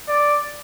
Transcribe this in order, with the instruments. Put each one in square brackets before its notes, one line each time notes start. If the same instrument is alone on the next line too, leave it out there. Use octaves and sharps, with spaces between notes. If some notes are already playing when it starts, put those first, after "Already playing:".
[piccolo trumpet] D5